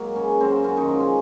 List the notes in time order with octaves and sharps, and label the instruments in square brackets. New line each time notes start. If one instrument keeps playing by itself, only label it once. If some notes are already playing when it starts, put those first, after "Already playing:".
Already playing: [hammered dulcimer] F#3 G#3 A#3 G#4
C#3 C#4
F#3 A#3 C4
F#2 C#4
D#3 D#4
F3 G#3
C#4